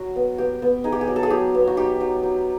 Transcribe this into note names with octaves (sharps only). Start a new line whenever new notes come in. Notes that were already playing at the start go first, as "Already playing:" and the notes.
Already playing: F#3 F#4
B3
B3 G4
B3
D#4 G#4
G4
G#4
F#3
A4
G#4
F#3 G4
B3
F#4
D#4 G4
F#3
F#3